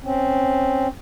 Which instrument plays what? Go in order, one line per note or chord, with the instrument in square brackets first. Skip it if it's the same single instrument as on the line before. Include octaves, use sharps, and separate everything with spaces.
[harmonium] C4 C#4